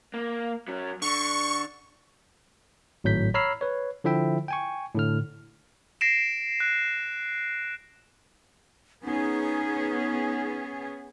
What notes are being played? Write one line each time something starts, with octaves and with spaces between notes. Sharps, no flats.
A#3
F#3 C#4
D3 C#6
G#1 A2 F#3 G6 B6
C#5 A#5 B5 E6 F6 C7
B4 C#5
D3 F3 E4 E5 G5
G5 G#5 C#6
A2 D3 F6
A#6 C7 D7 E7
F#6
B3 C#4 D#4 G#4